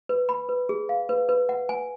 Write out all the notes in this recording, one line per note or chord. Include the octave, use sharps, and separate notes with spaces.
B4
B5
B4
G#4
F5
B4
B4
F#5
G#5